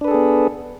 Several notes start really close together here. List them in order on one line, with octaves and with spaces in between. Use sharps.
D4 B4 A4 G#4 B3